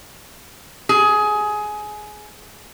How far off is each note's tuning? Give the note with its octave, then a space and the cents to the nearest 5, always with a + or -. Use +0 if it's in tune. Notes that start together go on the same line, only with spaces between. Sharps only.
G#4 +20